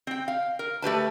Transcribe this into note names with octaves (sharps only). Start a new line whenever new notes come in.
C4 G5
F5
A#4
A3 G4 B4 A5